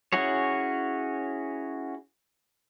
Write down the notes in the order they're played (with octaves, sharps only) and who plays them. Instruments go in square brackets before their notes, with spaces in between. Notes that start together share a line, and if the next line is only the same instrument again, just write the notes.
[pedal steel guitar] C#4 E4 F#4 G#4 C#5